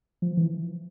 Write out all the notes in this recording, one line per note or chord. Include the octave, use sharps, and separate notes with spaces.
F3
E3